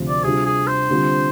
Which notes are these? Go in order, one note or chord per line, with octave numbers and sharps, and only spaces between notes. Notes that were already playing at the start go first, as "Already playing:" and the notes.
Already playing: D2 C3 F3 C4
D5
C3 G3 D4 F4 G#4
G#4
C5
D3 G3 C4 F4